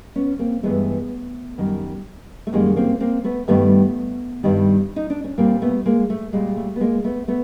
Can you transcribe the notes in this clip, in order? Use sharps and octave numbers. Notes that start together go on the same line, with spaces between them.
B3 C#4
A#3 C4
G2 E3 G#3 A3 B3
F#2 D#3 G3
A3
F#2 D#3 G3 G#3 A#3
A#3 C4
A#3 C4
A3 B3
G2 D#3 G3 A3 B3
G2 D#3 G3
D#4
D4
C#4
A#2 G3 A#3 C4
A3 B3
G#3 A#3
A3
A#2 G3 G#3
A3
B3
G#3 A#3
A3 B3
A3 B3